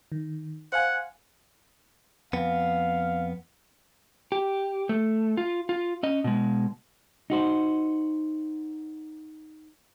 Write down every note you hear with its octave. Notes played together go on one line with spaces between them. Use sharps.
D#3
C5 F5 F#5 G#5
F2 B3 F5
G4
A3
F4
F4
C#4 D#5
B2 G#3
D#4 F#4 C5